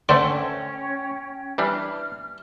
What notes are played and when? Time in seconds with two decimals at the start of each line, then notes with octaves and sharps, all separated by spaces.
0.09 D3 A3 C4 C#4 D5 G5
1.58 E3 G3 D4 F6